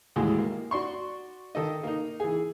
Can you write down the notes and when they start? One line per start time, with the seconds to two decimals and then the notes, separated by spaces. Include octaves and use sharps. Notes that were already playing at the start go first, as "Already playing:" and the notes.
0.16 D#2 A2 E3 G#3 F#4
0.38 A#3
0.71 F#4 D5 C6 C#6
1.55 D#3 A4 D#5
1.83 A#3 D#4
2.20 E3 G#4